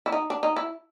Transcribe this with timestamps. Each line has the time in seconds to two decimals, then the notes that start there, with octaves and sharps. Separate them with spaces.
0.06 E4
0.12 D#4
0.30 D4
0.43 D#4
0.56 E4